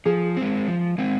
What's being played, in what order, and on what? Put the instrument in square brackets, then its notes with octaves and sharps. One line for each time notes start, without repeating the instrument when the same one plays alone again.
[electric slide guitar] F3 [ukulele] G#4
[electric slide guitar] G#3 C4
F3
G#3 C4